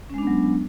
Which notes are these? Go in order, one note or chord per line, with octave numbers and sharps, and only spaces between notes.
F#3 G#3 B3 C#4 D4